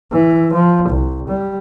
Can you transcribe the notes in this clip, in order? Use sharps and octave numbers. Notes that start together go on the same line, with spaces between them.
E3
F3
C2
G3